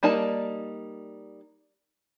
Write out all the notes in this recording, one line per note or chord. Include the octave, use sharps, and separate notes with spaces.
G3 A#3 D#4 D5 A5